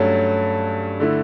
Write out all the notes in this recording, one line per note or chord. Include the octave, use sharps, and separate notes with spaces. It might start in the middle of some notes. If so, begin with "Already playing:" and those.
Already playing: G2 F#3 A3 C#4
D3 A3 E4